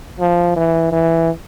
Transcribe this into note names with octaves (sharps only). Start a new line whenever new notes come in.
F3
E3
E3